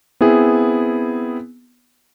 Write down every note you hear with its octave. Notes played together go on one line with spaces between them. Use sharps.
B3 C4 E4 G#4